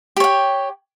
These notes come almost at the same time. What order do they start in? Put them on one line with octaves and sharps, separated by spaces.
G4 C#5 G5